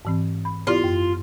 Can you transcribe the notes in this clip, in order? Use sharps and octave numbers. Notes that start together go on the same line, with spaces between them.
G#2 E3 C4
B5
B3 E4 F4 G4
F#2